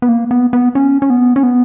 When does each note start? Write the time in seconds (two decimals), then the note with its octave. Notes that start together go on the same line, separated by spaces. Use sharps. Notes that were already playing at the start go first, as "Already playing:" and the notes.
0.02 B3
0.09 A#3
0.31 B3
0.53 B3
0.75 C#4
1.02 C#4
1.10 B3
1.36 C#4
1.43 B3